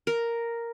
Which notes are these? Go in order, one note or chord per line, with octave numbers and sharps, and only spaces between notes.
A#4